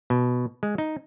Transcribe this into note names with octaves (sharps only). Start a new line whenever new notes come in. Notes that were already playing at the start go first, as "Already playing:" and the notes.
B2
G#3
D#4